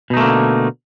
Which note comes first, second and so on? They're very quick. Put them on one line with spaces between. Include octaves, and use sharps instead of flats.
B2 D#4 A3 A#3 D3